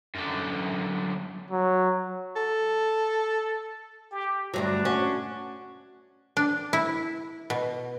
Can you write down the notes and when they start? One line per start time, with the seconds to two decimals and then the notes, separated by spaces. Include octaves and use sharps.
0.15 F#2 D3
1.51 F#3
2.36 A4
4.11 G4
4.54 D2 G2 F#3 D4
4.85 C#4 F#4
6.37 D4
6.73 E4
7.50 B2